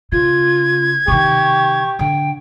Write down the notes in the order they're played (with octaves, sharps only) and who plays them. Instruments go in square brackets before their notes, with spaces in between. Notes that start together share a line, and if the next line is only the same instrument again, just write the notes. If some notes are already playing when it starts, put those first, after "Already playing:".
[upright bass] C#3 [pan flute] F4 [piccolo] G#6
[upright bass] C3 D#3 [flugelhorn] G4 [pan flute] C#6
[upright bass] D3 [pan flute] G5